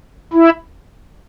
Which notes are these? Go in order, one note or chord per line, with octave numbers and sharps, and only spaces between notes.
E4